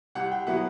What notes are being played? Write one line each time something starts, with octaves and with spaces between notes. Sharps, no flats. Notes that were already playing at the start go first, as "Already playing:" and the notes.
C2 F#5
G5
B2 F#3 B3 E4 F#5